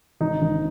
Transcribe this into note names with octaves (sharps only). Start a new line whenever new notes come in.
G#1 D#4
G#1